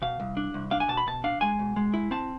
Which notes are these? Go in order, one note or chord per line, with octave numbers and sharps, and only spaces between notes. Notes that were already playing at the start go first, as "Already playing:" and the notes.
B2 F5
C2
D4
C2
D4 F5
G#5
B2 A5
B5
B2 A5
D4 F5
G#3 G#5
B2
G#3
E4
C4 A5